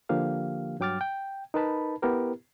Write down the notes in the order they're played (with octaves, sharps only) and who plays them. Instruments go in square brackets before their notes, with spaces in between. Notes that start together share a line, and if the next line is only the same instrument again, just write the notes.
[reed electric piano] D3 F3 A#3 G4 F5
G2 F#3 G5 D6 F6 A6
G5
D#4 A#4 B4 A5 B5
B3 E4 G4 A#4 B4